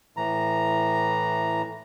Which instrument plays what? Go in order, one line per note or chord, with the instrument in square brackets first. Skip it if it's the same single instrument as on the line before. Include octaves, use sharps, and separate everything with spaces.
[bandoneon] A2 E3 A#5